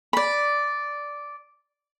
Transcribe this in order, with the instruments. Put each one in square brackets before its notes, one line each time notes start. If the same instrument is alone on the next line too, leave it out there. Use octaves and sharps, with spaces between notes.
[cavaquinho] D5 B5